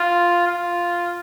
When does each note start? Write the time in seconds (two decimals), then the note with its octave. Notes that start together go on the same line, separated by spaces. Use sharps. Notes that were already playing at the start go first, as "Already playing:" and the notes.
Already playing: F4
0.47 F4